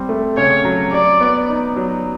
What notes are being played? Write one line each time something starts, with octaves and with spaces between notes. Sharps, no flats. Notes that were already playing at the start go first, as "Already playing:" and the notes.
Already playing: G3 C4
A3
C#3 C#5
F#3
F#3 D5
B3
D#4
F#3